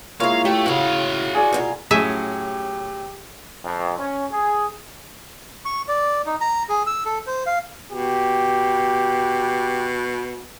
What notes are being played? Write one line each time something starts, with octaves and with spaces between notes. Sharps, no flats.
G#3 A#3 E4 F4 C#5 F5
A3 G4
A2 C#3 F#4 F5
G#4 D5
B2 A#3 F4
A2 F#3 C#4 G4 G#4 E5
F2
C#4
G#4
C#6
D5
D#4
A#5
G#4
E6
A4
C5
F5
B2 G4